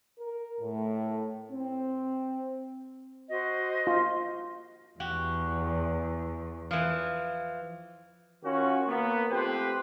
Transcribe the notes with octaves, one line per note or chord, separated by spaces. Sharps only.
A#4
A2
C4
F#4 C5 D#5
F4
E2 F#4 G4
E3 F3
D#3 C#4 F4 F#4
A#3 B3
F3 A3 C4 G4 B4 C5